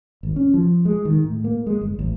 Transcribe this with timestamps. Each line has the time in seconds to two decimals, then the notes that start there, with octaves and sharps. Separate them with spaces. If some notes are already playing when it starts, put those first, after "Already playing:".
0.23 G#1
0.36 C#4
0.54 F3
0.85 G#3
1.05 D#3
1.24 A2
1.44 A#3
1.67 G#3
1.81 G1
1.99 A1